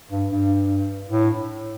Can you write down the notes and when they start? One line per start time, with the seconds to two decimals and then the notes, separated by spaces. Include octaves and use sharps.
0.11 G2
0.31 G2
1.09 A2